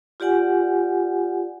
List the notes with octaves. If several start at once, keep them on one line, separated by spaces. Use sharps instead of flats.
F4 G4 D5 F#5 G#5